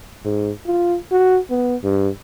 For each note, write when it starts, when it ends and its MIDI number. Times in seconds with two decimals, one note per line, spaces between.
0.25 0.52 44
0.66 0.97 65
1.12 1.39 66
1.50 1.76 59
1.84 2.09 43